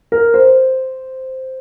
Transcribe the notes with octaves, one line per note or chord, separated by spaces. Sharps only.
A#4
C5